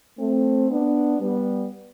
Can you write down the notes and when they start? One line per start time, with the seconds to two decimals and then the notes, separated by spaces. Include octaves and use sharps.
0.19 A3 C4
0.69 B3 D4
1.20 G3 B3